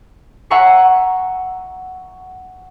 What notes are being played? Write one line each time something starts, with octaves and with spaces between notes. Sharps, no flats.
E5 F#5 G#5 A#5 C#6 C7